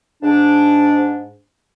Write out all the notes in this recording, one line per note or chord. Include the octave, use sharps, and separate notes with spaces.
G#2 D4